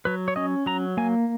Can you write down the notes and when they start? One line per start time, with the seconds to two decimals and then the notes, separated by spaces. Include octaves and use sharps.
0.05 F#3 B4
0.28 C#5
0.36 C#4 D#5
0.66 F#3 A#5
0.97 A#3 G#5